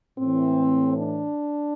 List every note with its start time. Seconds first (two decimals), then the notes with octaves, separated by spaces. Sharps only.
0.18 A2 E3 C4
0.97 D4